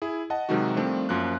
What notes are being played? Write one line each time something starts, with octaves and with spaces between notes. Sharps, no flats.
E4 G#4
D#5 F#5 A5
C3 D#3 F#3 G#3 D#4 F#4
D#3 F3 G3 A3 C4 D4
F#2 F3 A#3 F#6